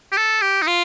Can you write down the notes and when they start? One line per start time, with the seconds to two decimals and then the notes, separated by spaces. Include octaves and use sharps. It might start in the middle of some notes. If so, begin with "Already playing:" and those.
0.12 G4
0.17 A4
0.42 G4
0.62 D#4
0.67 F4